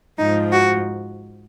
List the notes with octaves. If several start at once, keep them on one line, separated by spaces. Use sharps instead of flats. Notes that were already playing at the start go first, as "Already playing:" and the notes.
G#2 F3 D#4
F#4